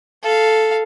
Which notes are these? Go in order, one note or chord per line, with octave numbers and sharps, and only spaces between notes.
A4 F5